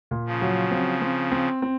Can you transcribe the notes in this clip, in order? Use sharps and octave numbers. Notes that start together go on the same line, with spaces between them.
A#2
C#3 F3
F#3
C4
C4
C4
C4